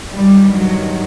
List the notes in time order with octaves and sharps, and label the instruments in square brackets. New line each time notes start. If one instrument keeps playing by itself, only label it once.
[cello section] G2 D#3 G3
F#3